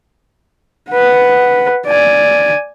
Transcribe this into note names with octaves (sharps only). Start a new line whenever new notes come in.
B4 F#5
D5 G#5